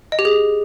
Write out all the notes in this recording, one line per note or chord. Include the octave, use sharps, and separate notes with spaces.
D#5
G4
G#4